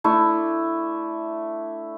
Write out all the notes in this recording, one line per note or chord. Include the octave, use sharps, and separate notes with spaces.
A3 D4 E4